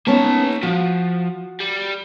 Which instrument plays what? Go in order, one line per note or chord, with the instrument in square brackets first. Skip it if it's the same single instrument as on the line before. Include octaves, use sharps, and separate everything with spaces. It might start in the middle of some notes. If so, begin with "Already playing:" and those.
[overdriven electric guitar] A#3 A5 [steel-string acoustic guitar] B3 C#4 D#4
[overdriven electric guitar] F3 [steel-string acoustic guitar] F#4
[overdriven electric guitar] G3